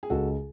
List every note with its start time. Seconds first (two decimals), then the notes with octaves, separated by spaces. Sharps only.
0.03 G#4
0.10 C#2 F#4 A4